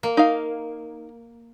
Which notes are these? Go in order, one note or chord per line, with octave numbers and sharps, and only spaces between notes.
A#3
D#4 F5